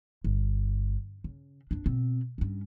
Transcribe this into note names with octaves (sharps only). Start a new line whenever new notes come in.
G1
C#3
F2 D4
B2 C4
G2 C#4